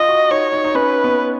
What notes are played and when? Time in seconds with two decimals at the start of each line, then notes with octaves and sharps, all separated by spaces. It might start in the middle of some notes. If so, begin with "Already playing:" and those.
Already playing: F4 D#5
0.08 F#4
0.31 D#4 C#5
0.52 D#4
0.64 D#4
0.75 C#4 B4
1.04 B3